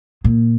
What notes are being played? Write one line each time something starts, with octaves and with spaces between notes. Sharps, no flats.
A#2